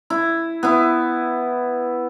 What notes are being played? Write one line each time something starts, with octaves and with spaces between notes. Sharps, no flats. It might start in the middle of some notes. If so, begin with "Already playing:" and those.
E4
B3 E4